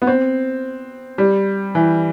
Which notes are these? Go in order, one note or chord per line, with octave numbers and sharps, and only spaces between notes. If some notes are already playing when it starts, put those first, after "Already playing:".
B3
C4
G3
E3